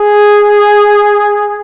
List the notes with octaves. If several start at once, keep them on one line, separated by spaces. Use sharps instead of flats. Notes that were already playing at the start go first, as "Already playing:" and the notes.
Already playing: G#4